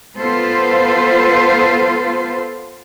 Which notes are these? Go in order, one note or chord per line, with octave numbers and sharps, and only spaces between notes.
B3 F4 A4 B4 C5